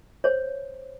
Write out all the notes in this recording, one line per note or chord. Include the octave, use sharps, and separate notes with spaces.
C5 C#5